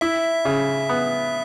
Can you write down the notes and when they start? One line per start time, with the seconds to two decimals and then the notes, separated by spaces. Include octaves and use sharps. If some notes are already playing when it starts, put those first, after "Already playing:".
0.01 E4 E5
0.45 C#3
0.89 B3